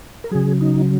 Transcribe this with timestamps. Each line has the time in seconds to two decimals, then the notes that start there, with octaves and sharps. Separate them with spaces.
0.24 A#4
0.31 C#3 F#3 G#4
0.61 D#4